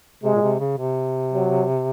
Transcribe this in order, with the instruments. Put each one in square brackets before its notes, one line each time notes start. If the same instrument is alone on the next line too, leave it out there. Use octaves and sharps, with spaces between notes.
[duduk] C3 [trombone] G#3
[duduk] A#2
C3
C#3
C3
[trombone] F#3